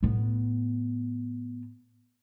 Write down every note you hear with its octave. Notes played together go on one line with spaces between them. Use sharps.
A2 B3